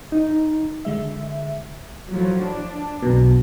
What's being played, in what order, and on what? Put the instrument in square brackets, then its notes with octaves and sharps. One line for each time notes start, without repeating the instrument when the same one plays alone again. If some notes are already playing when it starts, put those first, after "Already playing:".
[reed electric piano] D#4
[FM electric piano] D3 G#3 E5
[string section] A2 F3 F#3
D4
[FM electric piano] B1 B2